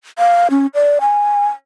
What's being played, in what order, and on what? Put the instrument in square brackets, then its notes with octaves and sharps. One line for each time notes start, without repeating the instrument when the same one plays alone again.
[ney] F5
C#4
D5
G#5